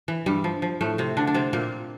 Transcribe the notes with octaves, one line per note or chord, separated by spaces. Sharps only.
E3
G2 G3
F3
F3
A2 A3
C3 C4
D3 D4
D4
C3 C4
A#2 A#3